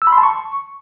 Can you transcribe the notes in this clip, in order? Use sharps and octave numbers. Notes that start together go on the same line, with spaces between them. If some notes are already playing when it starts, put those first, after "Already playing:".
E6
B5
C6
A5
C#6